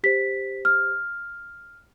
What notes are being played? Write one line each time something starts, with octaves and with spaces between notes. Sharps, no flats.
G4 C5 B6
F6